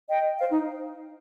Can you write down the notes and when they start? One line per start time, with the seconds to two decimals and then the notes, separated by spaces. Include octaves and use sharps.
0.09 D#5 G5
0.39 C5 F5
0.50 D#4